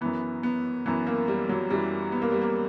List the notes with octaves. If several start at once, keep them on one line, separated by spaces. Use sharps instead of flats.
F#2 E3 B3
B3
F#2 E3 B3
A#3
G3
F#3
F#2 E3 G3
B3
A#3
G3
A#3